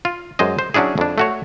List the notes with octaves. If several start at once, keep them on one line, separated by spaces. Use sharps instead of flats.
F4
F#2 G#3 C5 D#5
C5
F#3 C#4 D4 E4 G#4
F2 D4
A3 F#4 C#5